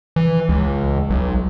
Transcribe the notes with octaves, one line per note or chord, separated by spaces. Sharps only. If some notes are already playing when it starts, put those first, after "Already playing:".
E3
C#2
B1